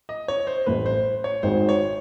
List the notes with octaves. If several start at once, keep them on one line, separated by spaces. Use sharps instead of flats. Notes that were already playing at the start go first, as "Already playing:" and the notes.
D#5
C#5
C5
A1 A2 E3 A3 B4
C5
C#5
G#1 G#2 D#3 C5
C#5